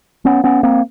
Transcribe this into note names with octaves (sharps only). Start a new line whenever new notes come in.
B3 C#4
B3 C#4
A#3 C4